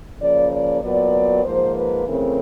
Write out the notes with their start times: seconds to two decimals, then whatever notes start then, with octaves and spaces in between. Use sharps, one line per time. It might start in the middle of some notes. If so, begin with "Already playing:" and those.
0.19 C#3 F3 A#3 D5
0.50 D5
0.82 A#2 F#3 B3 D5
1.43 G#2 F3 A#3 C5
1.75 B4
2.05 C#3 E3 A3 C4 A#4